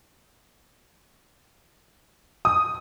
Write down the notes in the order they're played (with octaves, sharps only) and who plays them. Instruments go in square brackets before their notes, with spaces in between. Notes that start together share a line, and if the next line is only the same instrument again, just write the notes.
[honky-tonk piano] D#6